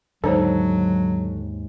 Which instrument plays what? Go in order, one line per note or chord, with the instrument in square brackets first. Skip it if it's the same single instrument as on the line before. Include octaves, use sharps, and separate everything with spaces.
[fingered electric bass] D#2 G#2 [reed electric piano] D3 A4 [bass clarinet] F#3 [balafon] D#4 C5 C#5